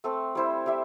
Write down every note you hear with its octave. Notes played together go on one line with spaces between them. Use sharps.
A3 C4 A4
G3 E4 C5
G3 E4 G4 E5